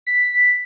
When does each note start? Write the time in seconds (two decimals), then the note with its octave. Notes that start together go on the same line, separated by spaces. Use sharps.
0.07 B6